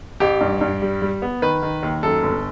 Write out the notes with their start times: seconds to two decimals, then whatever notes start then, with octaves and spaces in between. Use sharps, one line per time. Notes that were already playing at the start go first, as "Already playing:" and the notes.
0.20 A1 G4
0.41 G2
0.61 G2
0.82 G3
1.02 G3
1.22 B3
1.42 D#3 B4
1.62 D#3
1.83 D#2
2.03 F#2 A4
2.23 G1